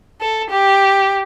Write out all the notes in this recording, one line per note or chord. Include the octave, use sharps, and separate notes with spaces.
A4
G4